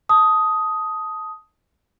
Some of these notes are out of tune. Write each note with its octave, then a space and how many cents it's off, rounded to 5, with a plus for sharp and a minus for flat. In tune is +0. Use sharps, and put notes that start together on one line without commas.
A5 +0 D#6 +10